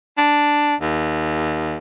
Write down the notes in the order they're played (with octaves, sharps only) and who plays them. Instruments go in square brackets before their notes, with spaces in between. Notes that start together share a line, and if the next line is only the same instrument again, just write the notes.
[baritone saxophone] D4
D#2